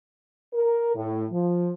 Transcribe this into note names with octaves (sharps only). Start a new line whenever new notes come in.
A#4
A2
F3